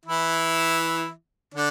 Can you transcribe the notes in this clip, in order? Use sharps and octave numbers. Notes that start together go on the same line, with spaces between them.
E3 E4
D3 D4